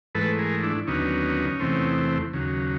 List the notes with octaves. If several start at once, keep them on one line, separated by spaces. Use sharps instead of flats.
G#2 E3 A3 A4 B4
G#4 A#4
D4 E4
D#2 D3 F#3 B3 C#4 D#4
E2 C3 E3 A3 C4
D#2 C#3 F#3